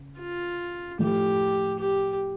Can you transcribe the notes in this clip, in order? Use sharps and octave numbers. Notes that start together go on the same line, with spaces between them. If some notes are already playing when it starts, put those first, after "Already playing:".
Already playing: C#3
F4
A2 F3 A3 E4 G4
G4